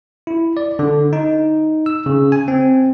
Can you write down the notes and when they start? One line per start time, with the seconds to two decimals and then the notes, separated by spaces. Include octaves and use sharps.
0.27 E4
0.57 D5
0.79 D3
1.13 D#4
1.86 E6
2.06 C#3
2.32 G#5
2.48 C4